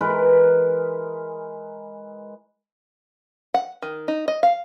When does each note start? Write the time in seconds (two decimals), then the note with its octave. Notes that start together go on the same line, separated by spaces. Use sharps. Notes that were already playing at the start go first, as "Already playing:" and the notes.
0.01 E3 G#3 A#4 B4
3.54 F#5
3.82 D#3
4.08 D#4
4.28 D#5
4.43 F5